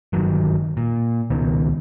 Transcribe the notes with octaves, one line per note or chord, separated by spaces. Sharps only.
G1 D#3 F#3
A#2
C#2 B2 D#3